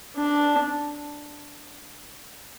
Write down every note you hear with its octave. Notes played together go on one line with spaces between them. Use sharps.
D4